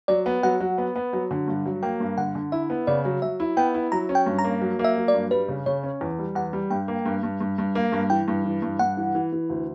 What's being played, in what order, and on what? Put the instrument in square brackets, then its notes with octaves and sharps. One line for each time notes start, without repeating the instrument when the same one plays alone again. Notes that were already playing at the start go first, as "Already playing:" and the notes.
[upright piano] F#3 [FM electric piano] D5
[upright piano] B3
[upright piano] F#3 [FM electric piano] F#5
[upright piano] F#3
B3
B3
F#3
D3
G2
F#3
[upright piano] A#3 [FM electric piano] G5
[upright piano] G2
[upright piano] D3 [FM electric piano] F#5
[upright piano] D3
[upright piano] E4 [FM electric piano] E5
[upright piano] B3
[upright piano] C#3 [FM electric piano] D5
[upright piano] F#3
[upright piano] F#3 [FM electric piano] E5
[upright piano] E4
[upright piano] B3 [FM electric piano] G5
[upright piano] E4
[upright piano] F#3 [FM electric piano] A#5
[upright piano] C#4
[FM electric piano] G5
[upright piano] G2
[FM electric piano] A#5
[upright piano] A#3
F#3
A#3
[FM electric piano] E5
[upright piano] F#3
[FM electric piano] D5
[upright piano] G2
[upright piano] G3 [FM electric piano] B4
[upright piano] C#3
[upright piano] C#3 [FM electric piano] C#5
[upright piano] C#4
E2
G3
[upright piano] E2 [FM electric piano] F#5
[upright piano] G3
[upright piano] G2 [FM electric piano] G5
[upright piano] A#3
G2
G2
G2
G2
A#3
G2
[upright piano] E3 [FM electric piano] G5
[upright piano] G2
E3
G2
[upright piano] G2 [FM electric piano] F#5
[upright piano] E3
E3
E3
D2